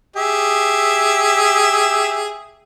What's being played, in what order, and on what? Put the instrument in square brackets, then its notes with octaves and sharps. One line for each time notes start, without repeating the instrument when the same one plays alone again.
[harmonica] G4 G#4 E5